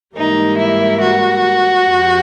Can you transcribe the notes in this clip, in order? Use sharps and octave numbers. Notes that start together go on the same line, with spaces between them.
G#2 E3 G3 A#3 D#4
E4
F#4
F2 C3 F3